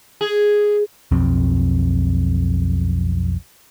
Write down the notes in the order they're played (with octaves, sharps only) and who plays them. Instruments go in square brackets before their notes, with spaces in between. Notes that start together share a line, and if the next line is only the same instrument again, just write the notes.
[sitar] G#4
[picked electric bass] B1 F2 C4